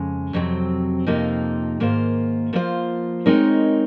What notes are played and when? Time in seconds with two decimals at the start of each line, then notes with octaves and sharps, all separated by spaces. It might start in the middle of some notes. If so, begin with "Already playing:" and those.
Already playing: F2 C#3 G#3
0.33 F2 C3 F#3 C4
1.07 F2 C3 F3 A#3 D#4
1.80 G#2 D#3 A#3 F4 C5
2.53 F3 A#3 F4 C5
3.26 G#3 C4 D#4 A#4 C#5